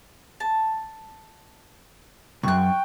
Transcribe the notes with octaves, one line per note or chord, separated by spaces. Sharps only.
A5
C2 F#2 G5 C#6 F#6